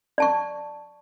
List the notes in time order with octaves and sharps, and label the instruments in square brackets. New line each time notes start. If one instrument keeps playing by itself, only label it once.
[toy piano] D5 A5 C#6